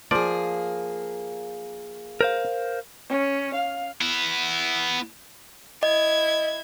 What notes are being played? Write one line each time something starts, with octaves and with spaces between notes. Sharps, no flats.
F3 A#3 G#4 D5
A#4 C5 F5
C#4
F5
B3 E4
E4 D#5 G#6